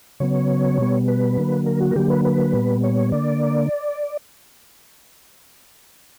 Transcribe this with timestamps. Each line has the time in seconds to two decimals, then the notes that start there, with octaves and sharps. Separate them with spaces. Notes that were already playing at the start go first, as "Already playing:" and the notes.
0.20 C#3 F#3 B3 C#5
0.79 B2 G3 B3
1.08 B4
1.37 D3 F#3 A#3
1.66 A#4
1.81 F#4
1.91 A#4
1.95 D3 F#3 A#3 G4
2.10 B4
2.25 B4
2.53 A#2 G3 B3
2.83 C#5
3.12 D3 A#3 D5